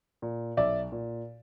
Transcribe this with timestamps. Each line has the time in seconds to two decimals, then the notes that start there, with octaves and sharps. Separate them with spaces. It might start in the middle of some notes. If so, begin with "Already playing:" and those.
0.22 A#2
0.57 B1 D5 E5
0.92 A#2